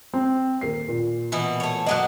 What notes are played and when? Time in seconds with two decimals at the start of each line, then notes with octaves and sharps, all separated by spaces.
0.14 C4
0.61 D#1 A#4 C7
0.88 A#2
1.32 B2 E3 E4
1.60 A3 C#5
1.86 B2 F#3 A#3 D#5 F#6